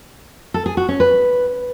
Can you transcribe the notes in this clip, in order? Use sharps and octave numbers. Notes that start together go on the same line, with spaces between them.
A4
G#4
F#4
C#4
B4